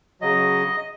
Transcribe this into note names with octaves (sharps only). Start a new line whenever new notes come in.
C#3 F#3 D#5